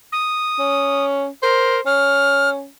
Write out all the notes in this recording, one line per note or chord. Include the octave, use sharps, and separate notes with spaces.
D#6
C#4
A#4 C5
C#4 F6